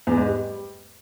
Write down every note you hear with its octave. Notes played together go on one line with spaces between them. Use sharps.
E2
G#2
G3